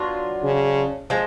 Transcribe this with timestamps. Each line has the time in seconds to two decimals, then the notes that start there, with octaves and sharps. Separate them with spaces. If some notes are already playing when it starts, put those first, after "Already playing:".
Already playing: F#3 B3 D4 F4
0.44 C#3
1.10 F3 G#3